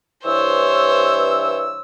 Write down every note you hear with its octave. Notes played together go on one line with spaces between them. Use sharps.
G2 E3 C5 C#5 E6